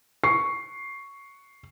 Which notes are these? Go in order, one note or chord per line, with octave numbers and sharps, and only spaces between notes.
C#6 C7